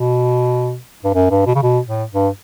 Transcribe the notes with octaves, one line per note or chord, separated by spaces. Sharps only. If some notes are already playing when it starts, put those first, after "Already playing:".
Already playing: B2
G2
F#2
G2
B2
C#3
B2
A2
G2